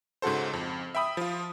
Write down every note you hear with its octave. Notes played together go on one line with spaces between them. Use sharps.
G#2 C#3 F#4 A4 C5
F2
E5 G5 B5 D#6
F3 F4